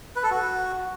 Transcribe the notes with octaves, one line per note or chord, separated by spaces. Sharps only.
B4
A4
F#4